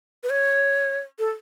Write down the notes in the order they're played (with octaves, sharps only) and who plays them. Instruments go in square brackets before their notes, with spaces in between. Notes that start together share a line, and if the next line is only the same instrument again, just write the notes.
[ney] B4
C#5
A4